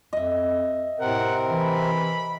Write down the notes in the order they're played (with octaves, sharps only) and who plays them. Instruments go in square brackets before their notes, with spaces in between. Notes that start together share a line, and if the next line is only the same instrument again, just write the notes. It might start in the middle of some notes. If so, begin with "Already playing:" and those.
[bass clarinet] F2 [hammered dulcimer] D#5 E5
[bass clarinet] A2 [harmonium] C3 C4 A#4 [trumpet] F#5
[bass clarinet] E3 [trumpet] B5